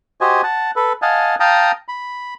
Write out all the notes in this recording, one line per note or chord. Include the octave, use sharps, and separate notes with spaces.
F#4 G4 C5 D#5 G#5
F#5 A5
A4 B4
D#5 F5 F#5 G#5 A5
F5 G5 A5 A#5 D#6
B5